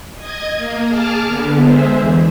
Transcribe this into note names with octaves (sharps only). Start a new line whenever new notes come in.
D#5 G#6
A#3
G#4 A5 D6 F6
D3 B3
G#3 G#4 C5 E5
E2 E3